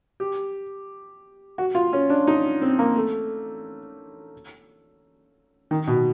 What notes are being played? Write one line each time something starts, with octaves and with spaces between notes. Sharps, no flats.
G4
F#4
F4
C#4
D4
D#4
C4
A#3
A3
D#3
B2